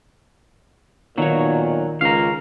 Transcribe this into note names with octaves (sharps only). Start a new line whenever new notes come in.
B1 A#2 D#3 F#3 C#5
C#2 A#4 F5